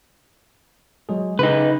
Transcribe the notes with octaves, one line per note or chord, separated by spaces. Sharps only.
F#3 G#3 G#4
C#3 D#4 B4